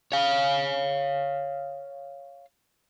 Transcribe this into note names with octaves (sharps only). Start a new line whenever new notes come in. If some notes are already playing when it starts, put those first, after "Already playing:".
C#5 F5